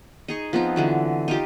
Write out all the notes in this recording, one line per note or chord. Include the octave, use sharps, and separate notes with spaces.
D#4 G#4 C#6
F3 B3 C4 D#4
D3 E3 F#3
D#4 F4 G4